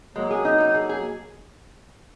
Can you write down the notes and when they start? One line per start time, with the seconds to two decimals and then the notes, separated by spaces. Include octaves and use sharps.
0.15 F#3 G#3 A#3
0.31 G#4
0.45 D#4
0.60 D#4
0.74 G#4
0.89 G#4